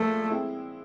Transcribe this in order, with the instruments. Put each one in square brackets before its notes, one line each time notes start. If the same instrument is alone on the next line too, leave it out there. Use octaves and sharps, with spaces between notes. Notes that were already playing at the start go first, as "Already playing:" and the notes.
Already playing: [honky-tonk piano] A#2 F3 G#3 [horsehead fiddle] A3
[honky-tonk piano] G#3 C4 E4